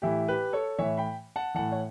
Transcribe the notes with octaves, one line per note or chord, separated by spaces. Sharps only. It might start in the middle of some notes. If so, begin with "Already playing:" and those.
A2 E3 E4 G4
G4 B4
A4 C#5
A2 E3 C#5 E5
G5 B5
F#5 A5
A2 E3 F#5 A5
C#5